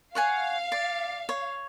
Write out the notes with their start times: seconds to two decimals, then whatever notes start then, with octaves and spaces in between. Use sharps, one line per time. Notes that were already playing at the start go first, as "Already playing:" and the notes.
0.15 C#5 F5 F#5 G#5
0.72 D5
1.29 C#5